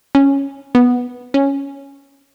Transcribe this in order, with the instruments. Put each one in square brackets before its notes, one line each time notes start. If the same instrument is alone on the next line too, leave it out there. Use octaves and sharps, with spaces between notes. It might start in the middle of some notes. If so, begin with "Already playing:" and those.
[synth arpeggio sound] C#4
B3
C#4